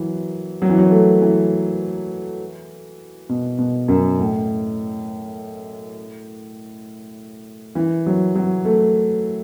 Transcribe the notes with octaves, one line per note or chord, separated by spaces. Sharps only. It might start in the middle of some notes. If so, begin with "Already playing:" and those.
Already playing: E3 F#3
F#3
E3
F#3
A3
E3
B2
B2
F#2
A2
E3
F#3
F#3
A3